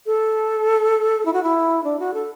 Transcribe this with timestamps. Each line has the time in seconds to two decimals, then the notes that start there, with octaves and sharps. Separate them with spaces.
0.06 A4
1.26 E4
1.33 F#4
1.43 E4
1.84 D4
2.00 F#4
2.14 A4